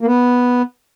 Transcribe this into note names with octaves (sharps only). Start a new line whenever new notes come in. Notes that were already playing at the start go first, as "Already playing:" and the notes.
A#3
B3